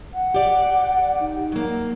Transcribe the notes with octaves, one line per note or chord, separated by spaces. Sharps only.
F#5
G4 D5
D#4
F#3 A#3